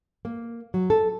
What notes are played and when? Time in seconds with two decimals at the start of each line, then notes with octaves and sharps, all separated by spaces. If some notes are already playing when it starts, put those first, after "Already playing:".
0.25 A#3
0.74 F#3
0.90 A4